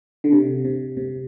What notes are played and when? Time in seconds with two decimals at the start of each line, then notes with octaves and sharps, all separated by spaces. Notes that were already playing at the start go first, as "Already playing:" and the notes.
0.24 D3
0.32 C3
0.64 C3
0.97 C3